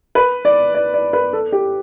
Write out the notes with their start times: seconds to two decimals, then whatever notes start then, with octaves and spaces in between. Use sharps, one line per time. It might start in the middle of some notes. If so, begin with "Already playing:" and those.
0.15 B4
0.45 D5
0.74 D5
0.94 D5
1.13 B4
1.33 A4
1.52 G4